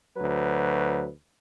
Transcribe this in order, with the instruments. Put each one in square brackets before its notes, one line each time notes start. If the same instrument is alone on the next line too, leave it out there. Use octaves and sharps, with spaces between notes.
[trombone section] D2 F#3 B4